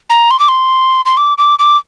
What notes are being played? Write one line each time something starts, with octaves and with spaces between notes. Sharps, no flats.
A#5
C6
D6
C6
C6
D6
D6
D6